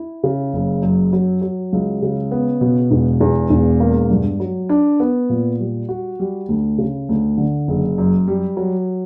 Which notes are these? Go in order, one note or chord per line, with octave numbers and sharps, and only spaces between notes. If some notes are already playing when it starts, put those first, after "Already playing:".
Already playing: E4
C#3
F#1
F#2
F#3
F#3
C#2
C#3
B3
B2
E1
E2
E1
A#3
G2
F#3
D4
B3
A#2
G3
F#4
G3
D2
C#3
D2
D3
F#1
F#2
G3
F#3